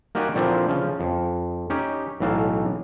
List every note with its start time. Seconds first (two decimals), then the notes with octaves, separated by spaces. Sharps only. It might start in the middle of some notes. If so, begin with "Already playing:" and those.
0.15 A#3 D#4 F#4 G4 D5 G#5
0.35 A#2 D3 F3 C4 D4 E4
0.69 C#3 F3
1.00 F2
1.70 C#4 D#4 G4
2.20 B1 A2 E3 F5 A5 A#5